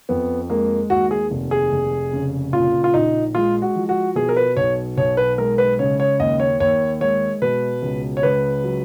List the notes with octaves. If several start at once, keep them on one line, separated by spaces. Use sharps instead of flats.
F2 B3
G#3 A#3
D#2 F#4
G#4
F1
G#4
F1
C#3
A#2 F4
F4
A#1 D#4
G#3 F4
F#4
F3
F#4
B2 G#4
A#4
B4
B1 C#5
B1 C#5
B4
G#3 A#4
B4
C#3 C#5
C#5
D#2 D#5
C#5
D#2 C#5
G#3 C#5
B2 B4
C#2
C#5
C#2 B4
F#3